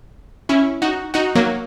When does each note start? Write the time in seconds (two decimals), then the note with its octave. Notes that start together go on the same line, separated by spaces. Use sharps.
0.49 C#4 E4
0.82 D#4 F#4
1.14 D#4 F#4
1.35 F#3 A#3